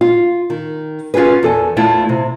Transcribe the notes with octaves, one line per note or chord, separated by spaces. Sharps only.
F4
D#3
C#4 F4 F#4 G#4 B4
E2 A4 G#5
E2 A3 E4 F4
C3